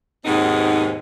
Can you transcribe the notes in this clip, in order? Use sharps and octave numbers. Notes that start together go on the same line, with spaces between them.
D#2 G#2 B2 B3 C4 D#4